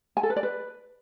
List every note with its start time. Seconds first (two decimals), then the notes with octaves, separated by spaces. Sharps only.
0.17 G#5
0.23 A4
0.30 B4
0.36 D5
0.43 B4